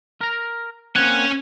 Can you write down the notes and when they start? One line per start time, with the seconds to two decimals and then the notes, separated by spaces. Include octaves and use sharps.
0.21 A#4 A#5
0.96 A#3 C4 C#4 F#5 G#5